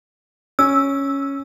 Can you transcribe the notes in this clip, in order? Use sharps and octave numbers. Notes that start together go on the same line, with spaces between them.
C#4 E6